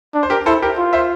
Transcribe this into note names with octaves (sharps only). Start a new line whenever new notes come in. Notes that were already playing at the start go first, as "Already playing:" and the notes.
D4
C5
G4 A#4
E4 A4 C5
G4 A#4
F4
C5 E5